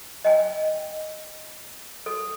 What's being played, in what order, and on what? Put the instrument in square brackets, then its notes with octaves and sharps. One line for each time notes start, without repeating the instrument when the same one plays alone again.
[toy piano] D#5 G5 G#5
A4